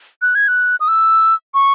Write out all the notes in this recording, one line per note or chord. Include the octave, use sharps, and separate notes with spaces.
F#6
G#6
F#6
D#6
E6
C#6